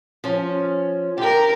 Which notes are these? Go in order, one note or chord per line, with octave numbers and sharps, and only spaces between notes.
F3 C#4
D3 G4 A#4